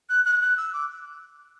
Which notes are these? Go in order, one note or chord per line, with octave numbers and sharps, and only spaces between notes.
F#6
F#6
F#6
E6
D6